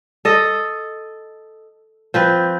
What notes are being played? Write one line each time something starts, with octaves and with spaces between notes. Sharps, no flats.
A4 D#5
F3 C4 B4